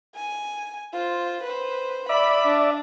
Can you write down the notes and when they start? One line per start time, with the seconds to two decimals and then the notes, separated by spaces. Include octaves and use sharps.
0.15 G#5
0.93 F4 C5
1.44 B4 C5
2.09 D5 E5 B5
2.45 D4